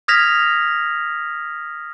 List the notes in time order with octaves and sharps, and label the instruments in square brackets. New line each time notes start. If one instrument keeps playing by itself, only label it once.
[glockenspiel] D#6 F6 G#6 A#6 B6 F7